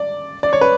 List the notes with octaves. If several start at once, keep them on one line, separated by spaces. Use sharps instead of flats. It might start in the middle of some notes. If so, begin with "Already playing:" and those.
Already playing: D5
D5
C#5
B4